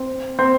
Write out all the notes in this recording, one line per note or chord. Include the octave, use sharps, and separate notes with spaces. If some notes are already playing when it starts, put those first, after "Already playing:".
Already playing: C4
C4